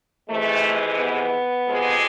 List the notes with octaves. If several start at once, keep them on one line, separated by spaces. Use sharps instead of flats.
F2 C3 E3 G#3 A3
B3
F2 C3 G#3